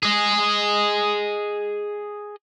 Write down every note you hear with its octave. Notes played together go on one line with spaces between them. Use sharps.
G#4 D#5